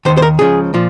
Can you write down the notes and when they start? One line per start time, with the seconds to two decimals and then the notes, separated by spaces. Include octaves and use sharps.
0.05 D#2 D#3 C5
0.17 C5
0.22 A#4
0.39 C#2 C#3 F3 G#4
0.74 A#2 F3